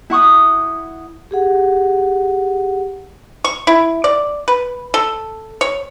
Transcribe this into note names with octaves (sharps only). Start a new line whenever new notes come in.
E4 F#5 C#6 D#6
G4 G#4 F#5
C#6
E4
D5
B4
A4
C#5